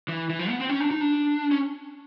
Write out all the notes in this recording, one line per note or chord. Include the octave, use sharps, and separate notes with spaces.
E3
E3
F3
B3
C4
C#4
D4
D#4
D4
C#4